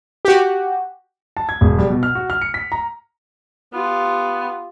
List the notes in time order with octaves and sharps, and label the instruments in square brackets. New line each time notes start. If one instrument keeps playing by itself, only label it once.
[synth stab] F#4 G4
[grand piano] A5
G#6
E1
G3
B2
F6
F#4
F6
C#7
B6
A#5
[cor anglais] B3 [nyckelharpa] F4 G4